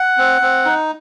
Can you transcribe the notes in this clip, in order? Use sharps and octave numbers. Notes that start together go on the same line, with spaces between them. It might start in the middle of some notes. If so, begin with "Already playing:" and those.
Already playing: F#5
C4
C4
D#4